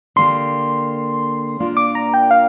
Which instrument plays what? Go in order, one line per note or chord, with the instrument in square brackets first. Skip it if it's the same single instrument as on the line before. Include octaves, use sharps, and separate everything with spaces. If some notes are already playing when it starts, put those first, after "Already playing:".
[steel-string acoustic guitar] D3 A#3 G4 [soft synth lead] C6
[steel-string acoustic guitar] A#2 A#3 D4 F4 A#4
[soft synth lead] D6
A#5
G5
F5